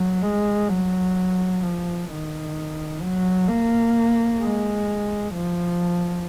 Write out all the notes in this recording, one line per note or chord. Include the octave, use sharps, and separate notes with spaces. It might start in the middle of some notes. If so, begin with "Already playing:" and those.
Already playing: F#3
G#3
F#3
F3
D#3
F#3
A#3
G#3
F3